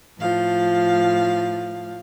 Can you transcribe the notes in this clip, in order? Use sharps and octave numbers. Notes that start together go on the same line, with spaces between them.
A2 F3 F5